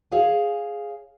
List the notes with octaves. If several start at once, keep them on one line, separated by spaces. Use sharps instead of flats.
G#4 C#5 F5 G#5